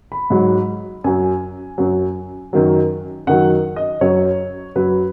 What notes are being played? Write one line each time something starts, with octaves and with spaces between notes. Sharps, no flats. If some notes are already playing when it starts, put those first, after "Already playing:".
B5
G#2 F#3
F#2 F#3 G#5
F#2 F#3
F#2 D#3 F#3
F#2 D#3 F#3 F#5
D#5
F#2 F#3 C#5
F#2 F#3 B4